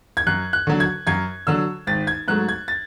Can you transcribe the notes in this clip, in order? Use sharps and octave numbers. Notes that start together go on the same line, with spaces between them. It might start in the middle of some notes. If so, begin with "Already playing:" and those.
G#6
F#2 F#6
F#6
D3 F#3
G#6
F#2 G#6
D3 F#3 E6
G#1 A6
G#6
G#2 F#3 A3 F#6
G#6
A6